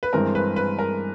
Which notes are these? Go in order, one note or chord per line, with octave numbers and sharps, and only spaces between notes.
B4
G2 E3 G#3 C4 A#4
B4
B4
A#4